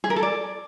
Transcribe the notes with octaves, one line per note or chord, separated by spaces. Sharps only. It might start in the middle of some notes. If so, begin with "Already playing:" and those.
G#4
A#4
A4
D5